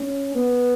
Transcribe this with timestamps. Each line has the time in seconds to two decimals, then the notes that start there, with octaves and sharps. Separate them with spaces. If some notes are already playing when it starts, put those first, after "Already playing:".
Already playing: C#4
0.35 B3